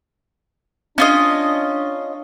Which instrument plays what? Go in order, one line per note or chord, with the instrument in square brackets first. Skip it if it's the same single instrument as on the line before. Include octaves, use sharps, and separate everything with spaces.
[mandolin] C#4 F4 D#5 [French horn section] D4